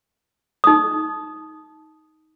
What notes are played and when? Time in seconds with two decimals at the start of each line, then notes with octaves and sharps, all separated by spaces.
0.64 D#4 D#6